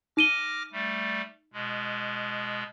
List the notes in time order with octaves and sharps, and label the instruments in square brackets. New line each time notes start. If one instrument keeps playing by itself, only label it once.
[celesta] D#4 D#7 G7 [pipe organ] D6 F6 A#6
[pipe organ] G3 A3
B2 G#3